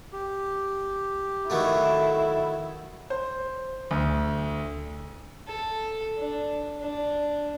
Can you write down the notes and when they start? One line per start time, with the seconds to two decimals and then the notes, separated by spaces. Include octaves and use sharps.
0.13 G4
1.50 D#3 F#3 A3 E4
3.10 C5
3.91 D2
5.48 A4
6.18 D4
6.81 D4